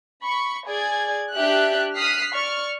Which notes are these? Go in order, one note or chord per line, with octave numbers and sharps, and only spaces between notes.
B5 C#6
G#4 D5 G#6
D4 G4 E5 F#6
D#6 F6 F#6 B6 C7
D5 C#6 F6